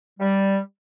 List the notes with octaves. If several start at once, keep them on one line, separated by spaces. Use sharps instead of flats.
G3